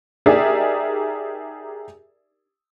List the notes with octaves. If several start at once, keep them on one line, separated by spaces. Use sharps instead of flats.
D#4 G4 G#4 A#4 D5 E5